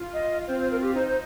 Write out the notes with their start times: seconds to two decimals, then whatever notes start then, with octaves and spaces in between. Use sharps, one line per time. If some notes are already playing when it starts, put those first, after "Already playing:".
Already playing: F4
0.14 D#5
0.47 C4 C5
0.59 C5
0.71 A#4
0.78 F4
0.83 G4
0.95 D#4 C5
1.07 C5